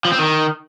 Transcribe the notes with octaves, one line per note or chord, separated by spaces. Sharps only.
F3
C4
D#3